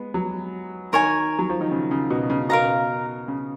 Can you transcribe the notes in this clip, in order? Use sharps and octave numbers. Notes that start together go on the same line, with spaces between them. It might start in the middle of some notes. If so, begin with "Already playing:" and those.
Already playing: G#3 B3
F#3
D#3 A#4 C#5 G#5
F#3
F3
D#3
C#3
C#3
B2
C#3
B2 A#4 F5 A#5
C#3